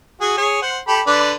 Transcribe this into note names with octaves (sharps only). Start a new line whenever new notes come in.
F#4 G#4
G#4 C#5
C5 F#5
G4 A4 B5
D3 B4 D5